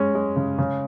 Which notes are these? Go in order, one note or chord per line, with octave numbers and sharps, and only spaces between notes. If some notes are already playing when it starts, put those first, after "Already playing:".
Already playing: G#3 C#4
G#3
C#3
C#3